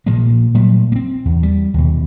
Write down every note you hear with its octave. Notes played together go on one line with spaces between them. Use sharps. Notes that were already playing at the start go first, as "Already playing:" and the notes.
A#2 F3 A#3
A#2 F#3 G3 A3
A#3 C4
E2
G3
D#2 B2